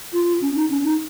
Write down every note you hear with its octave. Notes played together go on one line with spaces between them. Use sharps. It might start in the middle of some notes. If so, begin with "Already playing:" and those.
F4
C#4
D#4
C#4
D#4